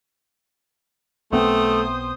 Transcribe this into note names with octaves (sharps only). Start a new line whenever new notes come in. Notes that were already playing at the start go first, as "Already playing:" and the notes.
B1 A3 B3 C4 C5 D#6